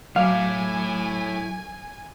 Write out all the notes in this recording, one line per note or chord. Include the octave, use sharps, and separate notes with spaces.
F#3 A3 E4 F5 G#5 D6